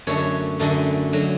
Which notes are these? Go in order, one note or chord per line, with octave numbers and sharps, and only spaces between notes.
F#2 D3 A3 C#5
F#2 D3 A3
D3 F#3